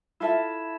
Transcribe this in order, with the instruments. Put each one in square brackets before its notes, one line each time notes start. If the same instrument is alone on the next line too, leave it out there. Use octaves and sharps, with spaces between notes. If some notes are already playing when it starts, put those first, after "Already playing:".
[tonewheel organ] E4 [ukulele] F4 A4 E5 A5